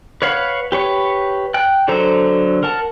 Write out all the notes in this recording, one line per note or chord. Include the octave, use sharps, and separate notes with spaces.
B4 C#5 F5 F#5
G4 B4 C#5
G5 F#6
D3 F#3 A4 C5 A#5
A#4 F#5 A5